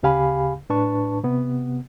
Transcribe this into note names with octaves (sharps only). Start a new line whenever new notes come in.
D2 C#3 G4 F5 G#5 B5
A2 D4 B4 A5 C#6
C3 B3